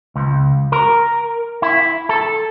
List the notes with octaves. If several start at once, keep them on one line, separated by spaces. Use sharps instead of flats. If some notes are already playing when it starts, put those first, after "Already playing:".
C#2
A#4
E4
A4